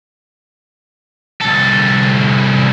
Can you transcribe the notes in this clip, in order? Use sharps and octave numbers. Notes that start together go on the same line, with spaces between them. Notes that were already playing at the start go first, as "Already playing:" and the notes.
C2 A4